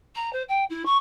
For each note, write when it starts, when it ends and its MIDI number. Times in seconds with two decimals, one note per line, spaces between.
0.15 0.32 82
0.33 0.43 72
0.48 0.64 79
0.70 0.85 64
0.85 0.96 85